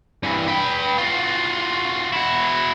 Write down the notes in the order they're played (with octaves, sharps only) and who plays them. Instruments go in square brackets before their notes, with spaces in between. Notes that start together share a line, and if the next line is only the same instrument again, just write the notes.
[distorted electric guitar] G2 E3
B4 G5
F4 F#4
E4 F#4